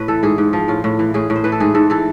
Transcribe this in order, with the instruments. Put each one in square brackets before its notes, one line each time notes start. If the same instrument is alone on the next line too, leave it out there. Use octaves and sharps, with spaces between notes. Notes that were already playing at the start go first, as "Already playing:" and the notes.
Already playing: [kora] A2 B4
E3 A4
G#2 G#4
G#2
F3
A2 F4
A2
E3
A2 G#4
A2
C5
E3 B4
A4
G#2 G#4
G#2 A4
E3 A4